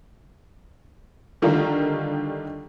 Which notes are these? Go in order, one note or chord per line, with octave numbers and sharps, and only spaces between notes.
D3 D#3 G3 F4 A#4